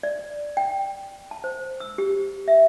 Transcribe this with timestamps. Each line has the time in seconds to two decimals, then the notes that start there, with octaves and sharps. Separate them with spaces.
0.03 D5
0.57 G5
1.31 A5
1.44 C5
1.80 E6
1.98 G4
2.48 E5